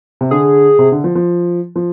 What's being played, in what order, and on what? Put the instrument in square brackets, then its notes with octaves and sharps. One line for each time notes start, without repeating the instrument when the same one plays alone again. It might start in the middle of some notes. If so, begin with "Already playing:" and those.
[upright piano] C3
[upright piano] D3 [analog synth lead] G#4
[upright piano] C3
D3
F3
F3
F3